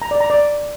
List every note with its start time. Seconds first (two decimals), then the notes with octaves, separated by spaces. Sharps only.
0.02 A#5
0.11 D5
0.20 A#5
0.30 D5